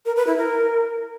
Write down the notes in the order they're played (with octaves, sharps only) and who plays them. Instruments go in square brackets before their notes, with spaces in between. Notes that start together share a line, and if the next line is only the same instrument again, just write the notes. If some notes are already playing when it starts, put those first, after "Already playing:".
[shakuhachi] A#4
B4
E4
A#4